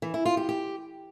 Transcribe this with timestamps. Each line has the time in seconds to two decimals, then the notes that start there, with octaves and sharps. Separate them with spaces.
0.02 E3
0.14 E4
0.25 F4
0.37 G4
0.49 G4